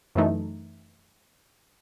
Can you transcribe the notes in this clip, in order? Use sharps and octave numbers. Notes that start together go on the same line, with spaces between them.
F#2 E3 A3 D#4